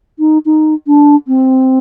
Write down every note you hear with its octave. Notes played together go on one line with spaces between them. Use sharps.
D#4
D#4
D4
C4